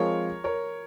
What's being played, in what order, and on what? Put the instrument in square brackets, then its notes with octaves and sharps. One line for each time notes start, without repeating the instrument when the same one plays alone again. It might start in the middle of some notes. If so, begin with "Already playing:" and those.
Already playing: [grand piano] F3 G#3 C4 F4 [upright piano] A#4 C#5
[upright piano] A#4 C#5